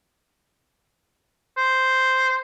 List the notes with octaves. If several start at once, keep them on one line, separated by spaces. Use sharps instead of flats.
C5